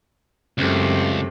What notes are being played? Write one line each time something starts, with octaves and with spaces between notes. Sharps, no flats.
C#2 F#2 C3 A3